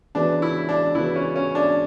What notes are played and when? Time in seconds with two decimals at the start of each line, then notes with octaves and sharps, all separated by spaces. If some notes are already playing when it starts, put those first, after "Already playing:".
0.15 C#3 E3 B3 D4 F#4 B4
0.42 E4
0.69 D4
0.95 C#3 E3 B3 E4 F#4 B4
1.15 C#4
1.36 C#4
1.55 D4